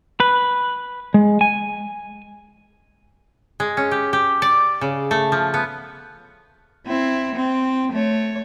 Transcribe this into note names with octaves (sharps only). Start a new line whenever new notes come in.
B4
G#3
G#5
G#3
C#4
G4
G4
D5
C#3
A3
F3
B3
C4 E4
C4
A3 C#5